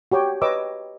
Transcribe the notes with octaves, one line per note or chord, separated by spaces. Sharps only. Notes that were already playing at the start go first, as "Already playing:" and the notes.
F#4 G4 C#5 G5
B4 C#5 D#5 D6 E6